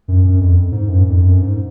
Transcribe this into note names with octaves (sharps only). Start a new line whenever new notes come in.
F#2
F#2
F2
G#2
F#2
F2
F#2
G#2